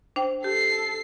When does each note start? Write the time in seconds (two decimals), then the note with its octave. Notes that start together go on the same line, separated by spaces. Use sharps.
0.16 D4 C5 G5
0.44 G4 A4 C7